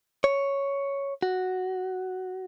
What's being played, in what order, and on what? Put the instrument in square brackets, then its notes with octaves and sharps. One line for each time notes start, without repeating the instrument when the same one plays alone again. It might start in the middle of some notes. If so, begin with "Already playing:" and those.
[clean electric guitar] C#5
F#4